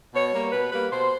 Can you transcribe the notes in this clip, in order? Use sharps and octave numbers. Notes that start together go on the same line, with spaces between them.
B2 C#5
G3 A#3
B2 B4
G3 A#3 B4
B2 C5